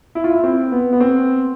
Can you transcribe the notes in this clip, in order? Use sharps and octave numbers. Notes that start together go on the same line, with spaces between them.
E4
F4
E4
C4
B3
B3
C4